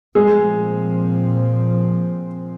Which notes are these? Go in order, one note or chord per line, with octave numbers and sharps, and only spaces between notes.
A#2 F3 G#3 C4 G#4